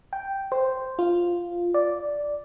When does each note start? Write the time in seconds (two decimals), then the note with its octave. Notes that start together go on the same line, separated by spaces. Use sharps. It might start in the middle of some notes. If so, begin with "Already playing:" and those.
0.13 G5
0.52 C5
0.99 F4
1.74 D5